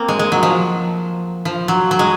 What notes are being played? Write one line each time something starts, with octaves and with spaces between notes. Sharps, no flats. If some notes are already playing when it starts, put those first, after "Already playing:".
Already playing: A#3 C4
G#3
G#3
F#3
F3
F3
F#3
F#3
G#3